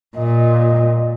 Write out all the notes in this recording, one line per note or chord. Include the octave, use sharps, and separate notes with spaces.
A#2 D#5